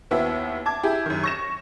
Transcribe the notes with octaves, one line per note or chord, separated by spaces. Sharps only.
D#2 B3 E4 F#4 E5
A5 D6 G#6
E4 G4 G#4
F#2 D#3
C#6 A#6 E7